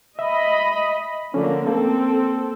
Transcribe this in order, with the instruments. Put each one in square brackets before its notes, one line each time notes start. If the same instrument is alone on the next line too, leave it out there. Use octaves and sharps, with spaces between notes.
[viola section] D#5 B5 [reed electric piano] E5
[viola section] D3 A#3 [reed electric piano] F3 C#4
[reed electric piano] A#3 [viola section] C4 A4